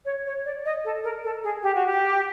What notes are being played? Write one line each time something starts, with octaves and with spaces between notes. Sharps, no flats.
C#5
C#5
D5
D#5
A4
A#4
A4
G#4
G4
F#4
G4